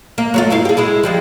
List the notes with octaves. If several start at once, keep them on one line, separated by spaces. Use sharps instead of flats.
A#3
F#3 A3 F4
G2 E4 F5
G4 G#4
G#3 E4 G#4
F3 G3 G#3